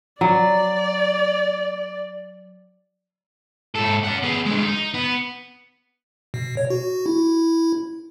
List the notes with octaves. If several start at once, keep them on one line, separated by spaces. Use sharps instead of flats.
F#3 D5
G#2 A4
C#4 F#5
B3 G#4
D3 G#3
D#4
B3
B2
C#5
F#4
E4